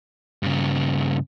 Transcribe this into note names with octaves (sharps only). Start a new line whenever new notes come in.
G2 C#3